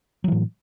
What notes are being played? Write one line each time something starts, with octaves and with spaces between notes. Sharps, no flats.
A2 E3 F#3